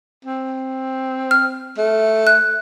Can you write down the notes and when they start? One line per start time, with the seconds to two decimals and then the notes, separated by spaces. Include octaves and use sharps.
0.25 C4
1.31 F6
1.78 A3
2.27 F#6